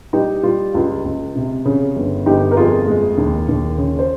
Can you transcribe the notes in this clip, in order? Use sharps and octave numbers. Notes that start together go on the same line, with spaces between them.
G3 D#4 G4
G3 F4
C#2 F4
C#2
C3
C#3
G1
G1 D#4 G4
A#4
F2 F4 G#4
G#3
D#2
D#2
C#3
C5